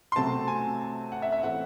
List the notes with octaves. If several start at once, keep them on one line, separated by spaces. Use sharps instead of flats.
C6
C3 F#3 A3 C4 A5
G#5
F#5
E5
E5
A2 E3 A3 C4 F#5